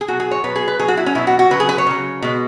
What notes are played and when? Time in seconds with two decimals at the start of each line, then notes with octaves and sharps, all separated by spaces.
0.01 G#4
0.08 B2 F#3 F#4
0.20 G#4
0.31 C#5
0.44 B2 F#3 B4
0.55 G#4
0.68 B4
0.79 B2 F#3 G#4
0.88 F#4
0.97 E4
1.06 C#4
1.15 B2 F#3 E4
1.27 F#4
1.39 F#4
1.51 C#3 F#3 B4
1.60 G#4
1.69 B4
1.78 C#5
1.87 C#3 F#3
2.22 B2 G#3